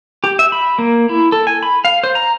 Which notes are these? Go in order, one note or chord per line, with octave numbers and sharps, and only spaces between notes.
G4
E5
B5
A#3
E4
A4
G#5
B5
F5
C5
A#5